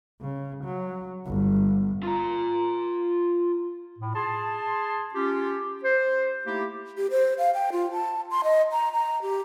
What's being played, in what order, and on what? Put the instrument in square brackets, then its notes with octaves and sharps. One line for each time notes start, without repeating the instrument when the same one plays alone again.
[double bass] C#3
F#3
G1
[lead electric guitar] F4 A#5
[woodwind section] A2
G#4 A5 C6
C#4 F4 G4
C5
A3 A#3 D#4 E4 G4
[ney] G4
C5
F5
G5
F4
A5
C6
D#5
A#5
A#5
G4